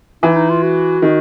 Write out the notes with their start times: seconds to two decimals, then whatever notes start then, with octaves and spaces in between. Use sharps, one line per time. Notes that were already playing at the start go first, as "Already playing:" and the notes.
0.23 E3 D#4
0.35 D#4
0.50 F4
0.63 F#4
1.02 D#3